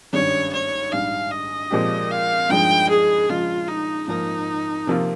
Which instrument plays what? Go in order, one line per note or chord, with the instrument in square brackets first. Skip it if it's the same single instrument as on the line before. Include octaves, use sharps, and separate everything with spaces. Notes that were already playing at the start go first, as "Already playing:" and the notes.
[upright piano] G#1 G2 G3 C#4 [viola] C#5
[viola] C#5
[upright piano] A#1 G#2 G3 [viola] F5
[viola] D#5
[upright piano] A#2 F3 G#3 C4 G4
[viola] F5
[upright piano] G2 F3 G#3 D#4 [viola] G5
[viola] G#4
[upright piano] C#3 F3 G#3 [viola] F4
[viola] D#4
[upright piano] G#2 F3 A#3 [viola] D#4
[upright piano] C3 F3 A#3 F4